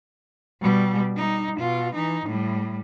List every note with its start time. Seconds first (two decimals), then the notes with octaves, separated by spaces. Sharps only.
0.61 B2 G3
1.17 G3 D#4
1.59 B2 F4
1.95 E3 D#4
2.26 A2 G3